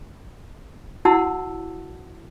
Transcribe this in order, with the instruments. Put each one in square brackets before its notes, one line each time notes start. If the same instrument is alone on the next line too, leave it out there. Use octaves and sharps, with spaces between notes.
[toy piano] E4 F#4 F#5 A5 C6 E6